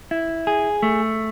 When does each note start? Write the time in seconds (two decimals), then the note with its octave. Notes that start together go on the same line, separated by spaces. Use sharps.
0.11 E4
0.47 G#4
0.82 A3